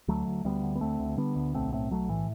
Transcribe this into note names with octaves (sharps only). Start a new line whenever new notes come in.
D2 F#3 A3
D2
D2 G3 B3
D3
B3
D2 A3 C4
D2
D3 G3 B3
D2
B1 A3 C4
A2 A3 C4
B1 F#3 A3
A2 E3